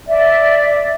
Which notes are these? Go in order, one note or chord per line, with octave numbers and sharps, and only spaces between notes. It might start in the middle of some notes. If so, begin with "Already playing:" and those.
D5 E5